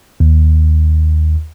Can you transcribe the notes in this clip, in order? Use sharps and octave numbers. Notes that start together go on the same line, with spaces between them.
D#2